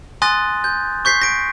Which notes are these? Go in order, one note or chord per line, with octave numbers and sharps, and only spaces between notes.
G#5 C6 D#6 F#6 A6 A#6
G6
C#6 G6 B6 C7
A#6 D7